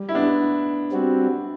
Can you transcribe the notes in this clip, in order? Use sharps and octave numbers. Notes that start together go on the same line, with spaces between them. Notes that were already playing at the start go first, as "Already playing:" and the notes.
Already playing: G3
E4
B3 D4
G3 C4 F#4